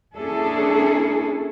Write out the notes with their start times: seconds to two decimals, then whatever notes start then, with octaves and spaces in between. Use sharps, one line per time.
0.16 A#3 C#4 D4 E4 G#4 A4